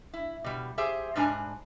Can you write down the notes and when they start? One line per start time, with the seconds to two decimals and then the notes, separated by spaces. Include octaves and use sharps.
0.13 E4
0.44 B2 G3
0.78 G4 G#4 C5 E5
1.16 G#2 G3 D4 A4 G#5 A#5